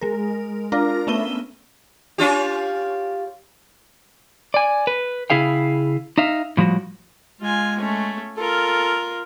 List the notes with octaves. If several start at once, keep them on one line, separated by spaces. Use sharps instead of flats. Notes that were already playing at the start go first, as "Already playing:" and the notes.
G#3 A#4
D4 F4 A#4 A#5
A3 B3 C#4 E5 D#7 G7
C#4 F4 G4
D5 G#5
B4
C#3 F3 E4 G#4 F5 G5
D#4 E5 F5
A2 F3 G3 F#4
G#3 F4 G#5
A3 C#4
F4 A4 A#4